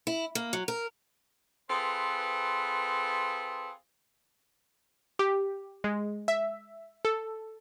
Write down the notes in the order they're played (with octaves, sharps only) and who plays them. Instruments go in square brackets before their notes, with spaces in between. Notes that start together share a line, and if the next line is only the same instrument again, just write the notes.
[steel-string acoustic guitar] E4
A#3
F#3
A#4
[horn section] C4 F4 G#4 A4 B4
[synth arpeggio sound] G4
G#3
E5
A4